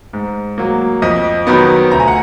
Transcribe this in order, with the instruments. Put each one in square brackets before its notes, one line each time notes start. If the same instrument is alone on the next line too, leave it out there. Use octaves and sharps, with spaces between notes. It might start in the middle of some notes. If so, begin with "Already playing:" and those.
[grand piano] G#2
F#3 A#3
F2 D#5
D#3 F#3 B3
D2 A#5
G#5
F#5